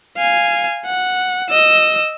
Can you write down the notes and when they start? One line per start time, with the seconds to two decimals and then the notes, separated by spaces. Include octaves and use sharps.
0.18 F5 G#5
0.86 F#5
1.50 D#5 E6